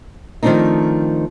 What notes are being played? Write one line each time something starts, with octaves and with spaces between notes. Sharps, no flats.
D#3 F3 A3 C4 D4 D#4